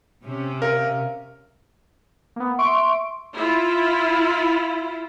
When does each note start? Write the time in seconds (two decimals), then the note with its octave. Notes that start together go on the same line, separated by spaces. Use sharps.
0.23 C3 C#4
0.62 A#4 F5
2.36 A#3 B3
2.58 E5 C6 C#6 D7
3.34 E4 F4